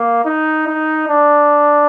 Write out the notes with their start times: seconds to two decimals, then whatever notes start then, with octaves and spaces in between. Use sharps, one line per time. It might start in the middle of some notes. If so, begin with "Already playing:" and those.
Already playing: A#3
0.25 D#4
0.67 D#4
1.08 D4